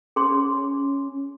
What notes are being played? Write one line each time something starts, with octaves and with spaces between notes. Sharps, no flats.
C#4 G#4 C6